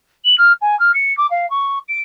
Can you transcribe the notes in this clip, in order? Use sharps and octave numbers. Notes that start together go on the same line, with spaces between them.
F#7
F6
G#5
F6
C#7
D6
F5
C#6
D7